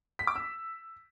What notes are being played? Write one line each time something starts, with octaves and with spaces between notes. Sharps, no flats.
B6
D6
E6